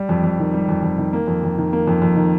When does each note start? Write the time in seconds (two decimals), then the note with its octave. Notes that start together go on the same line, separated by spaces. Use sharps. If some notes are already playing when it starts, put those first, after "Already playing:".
Already playing: G3
0.09 F2
0.24 F2
0.39 D#3
0.54 G3
0.69 F2
0.83 F2
0.98 D#3
1.13 A#3
1.27 F2
1.43 F2
1.58 D#3
1.73 A#3
1.87 F2
2.02 F2
2.16 D#3